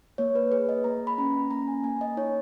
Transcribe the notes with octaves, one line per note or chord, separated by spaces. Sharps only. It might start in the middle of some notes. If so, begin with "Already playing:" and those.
A#3 C#5
B4
G#4 B4
D#5
A#3 A#5
B5
C#4 A#5
A#3 A#5
G#5
A#3 G#5
D#5
D#4 C#5